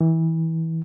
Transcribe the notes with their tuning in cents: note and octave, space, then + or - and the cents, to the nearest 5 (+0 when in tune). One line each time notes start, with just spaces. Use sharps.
E3 -25